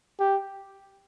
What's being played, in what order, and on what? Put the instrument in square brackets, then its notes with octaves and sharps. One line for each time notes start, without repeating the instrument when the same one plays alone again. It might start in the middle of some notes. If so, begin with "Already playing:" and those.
[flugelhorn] G4